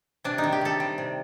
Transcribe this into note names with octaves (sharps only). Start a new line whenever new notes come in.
C3 D4
D#4
D#3
G4
C3 A4
G3
C3